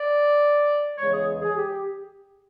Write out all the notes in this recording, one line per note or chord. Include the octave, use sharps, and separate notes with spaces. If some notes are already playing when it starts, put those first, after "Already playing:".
Already playing: D5
E2 C#3 E3 G#3 C#5
G#4
G#4
G4